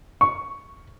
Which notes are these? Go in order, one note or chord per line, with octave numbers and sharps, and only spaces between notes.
C#6